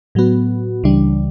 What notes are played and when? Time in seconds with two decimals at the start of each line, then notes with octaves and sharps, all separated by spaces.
0.15 A2 F#3 B3 F#4
0.84 C#2 C#3 E3 G3 D4